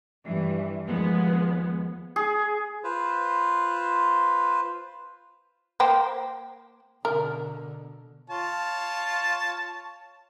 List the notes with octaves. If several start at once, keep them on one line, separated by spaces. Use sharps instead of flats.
G2 E3
D#2 F3 G#3 B3
G#4
F4 B4 C5
A#3 C5 G5
B2 D3 A#4
F4 C#5 A5